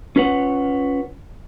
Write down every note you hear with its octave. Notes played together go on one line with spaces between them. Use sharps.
C#4 F4 B4 C#5 F#5